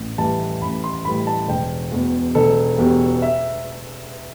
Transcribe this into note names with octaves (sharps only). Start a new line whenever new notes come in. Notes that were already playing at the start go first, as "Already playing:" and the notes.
Already playing: A1
A2 E3 G3 A5
A1 B5
C6
A2 E3 G3 B5
A5
E1 G5
E2 B2
E1 A4
E2 B2 G4
E5